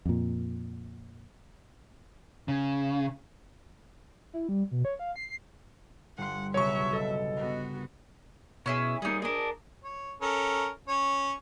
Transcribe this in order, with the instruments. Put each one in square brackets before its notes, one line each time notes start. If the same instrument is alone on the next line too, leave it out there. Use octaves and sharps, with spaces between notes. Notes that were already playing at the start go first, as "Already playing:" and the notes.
[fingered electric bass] F2 A#2
[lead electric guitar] C#3
[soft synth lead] E4
G3
B2
C#5
F5
C7
[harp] G1 C6 [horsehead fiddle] F#5
[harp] B1 C#3 [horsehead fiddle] F#3 E5 [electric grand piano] C#5 C#6
[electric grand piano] A4 [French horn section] D#5
[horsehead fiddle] B3 F#4 [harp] A#4
[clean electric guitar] B2 [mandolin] C#4 E4 G#4
[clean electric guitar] G3 A#3 [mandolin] D#4 G#4
[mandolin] D4 D#5 [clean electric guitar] G#4 A#4
[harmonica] C#5
C#4 A4 A#4
C#4 C#5